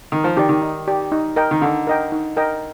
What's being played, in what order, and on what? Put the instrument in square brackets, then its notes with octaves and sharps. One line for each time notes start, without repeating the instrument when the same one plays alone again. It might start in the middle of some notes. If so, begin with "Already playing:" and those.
[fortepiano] D#3 [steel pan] D#4
[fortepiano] F3
[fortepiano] D#3 [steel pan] G4 D5
[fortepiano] D#3
[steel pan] D#4
G4 D5
D#4
A#4 D#5 G5
[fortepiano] D#3
[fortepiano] D3 [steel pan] D#4
[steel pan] A#4 D#5 G5
D#4
A#4 D#5 G5